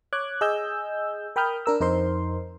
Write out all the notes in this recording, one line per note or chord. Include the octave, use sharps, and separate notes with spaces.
C#5 D6 F#6 G#6
G#4 D#5 G#5 E6 G6
A#4 G5 B5 D#6 F6 G6
D4 A#4 E6
F2 D#4 A#4 C5 C6